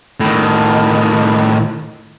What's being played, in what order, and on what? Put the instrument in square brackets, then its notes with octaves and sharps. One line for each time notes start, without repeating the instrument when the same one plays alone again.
[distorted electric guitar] A2 D#3